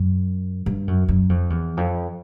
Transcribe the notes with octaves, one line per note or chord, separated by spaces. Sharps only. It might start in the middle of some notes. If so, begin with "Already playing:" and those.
Already playing: F#2
G2
F#2
F#2
F2
E2
F2